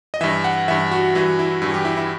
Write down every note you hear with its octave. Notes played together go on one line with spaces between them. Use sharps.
D#5
G2 E3 E5
F#5
G2 E3 E5
F#4
G2 E3 F#4
E4
G2 E3
G4
E4
E4